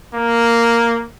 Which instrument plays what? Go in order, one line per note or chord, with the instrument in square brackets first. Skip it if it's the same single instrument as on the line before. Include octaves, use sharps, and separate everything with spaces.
[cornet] A#3